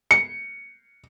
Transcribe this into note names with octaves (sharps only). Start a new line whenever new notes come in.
C#7